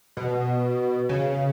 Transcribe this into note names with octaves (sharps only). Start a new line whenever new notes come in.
B2
C#3